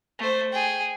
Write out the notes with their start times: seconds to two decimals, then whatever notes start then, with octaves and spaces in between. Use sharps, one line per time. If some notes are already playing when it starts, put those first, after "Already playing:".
0.19 A3 C5
0.53 G#4 G5